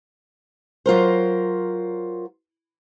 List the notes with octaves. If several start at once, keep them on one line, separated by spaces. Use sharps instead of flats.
F#3 F4 A#4 C5